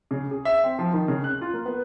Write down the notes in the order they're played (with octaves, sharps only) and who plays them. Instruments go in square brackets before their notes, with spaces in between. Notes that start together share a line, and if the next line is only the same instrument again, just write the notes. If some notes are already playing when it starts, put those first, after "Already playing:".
[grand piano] C#3
G#4
E5
C4
F3
D#3
C#3
F#6
F4
A#3
B3